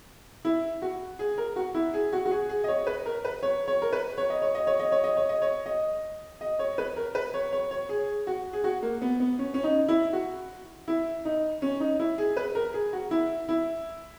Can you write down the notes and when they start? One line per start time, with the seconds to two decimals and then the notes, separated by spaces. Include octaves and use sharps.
0.45 E4
0.82 F#4
1.19 G#4
1.38 A#4
1.56 F#4
1.74 E4
1.93 G#4
2.13 F#4
2.25 F#4
2.31 G#4
2.49 G#4
2.64 D#5
2.68 C#5
2.87 B4
3.06 A#4
3.25 B4
3.43 C#5
3.68 C#5
3.82 A#4
3.93 B4
4.18 C#5
4.30 D#5
4.42 C#5
4.55 D#5
4.67 C#5
4.79 D#5
4.92 C#5
5.04 D#5
5.17 C#5
5.29 D#5
5.42 C#5
5.66 D#5
6.41 D#5
6.59 C#5
6.78 B4
6.96 A#4
7.15 B4
7.34 C#5
7.52 C#5
7.71 C#5
7.89 G#4
8.27 F#4
8.53 G#4
8.64 F#4
8.83 A#3
9.02 B3
9.20 B3
9.39 C#4
9.54 C#4
9.64 D#4
9.88 E4
10.13 F#4
10.88 E4
11.25 D#4
11.62 C#4
11.80 D#4
11.99 E4
12.18 G#4
12.37 B4
12.55 A#4
12.74 G#4
12.93 F#4
13.11 E4
13.49 E4